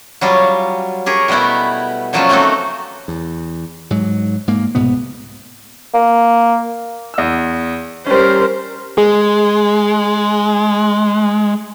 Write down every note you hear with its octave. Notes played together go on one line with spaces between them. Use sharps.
F#3 G3 F4
G4 G#4 A#4 C#5
B2 G3 A3 B3 E4
A#2 C#3 F3 F#3 C#4 F4
A3 A#3 C4 D#4 F#4 A4
E2
G#2 F#3
G#2 A#3
C2 G#2 B2 B3
A#3
E2 E6
G3 C#4 A#4 C5
G#3 G#4